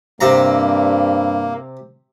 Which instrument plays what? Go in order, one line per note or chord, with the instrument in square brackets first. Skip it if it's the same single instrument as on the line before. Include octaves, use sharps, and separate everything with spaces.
[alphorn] G2 [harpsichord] C3 A#5 [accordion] A#3